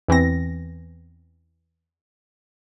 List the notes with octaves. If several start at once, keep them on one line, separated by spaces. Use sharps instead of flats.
E2 E3 C4 A#6